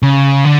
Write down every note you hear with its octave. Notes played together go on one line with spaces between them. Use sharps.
C#3
D3